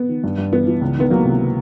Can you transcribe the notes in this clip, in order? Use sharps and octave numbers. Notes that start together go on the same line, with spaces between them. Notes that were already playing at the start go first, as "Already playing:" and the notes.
Already playing: B3
D#3
G2
G2
E3 B3
E3
C#2
D#3 B3
F#3 A#3
C3